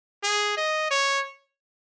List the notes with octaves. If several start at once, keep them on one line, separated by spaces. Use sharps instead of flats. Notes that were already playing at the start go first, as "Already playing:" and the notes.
G#4
D#5
C#5